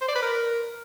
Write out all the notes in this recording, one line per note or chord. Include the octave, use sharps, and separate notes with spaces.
C5
D5
B4
A#4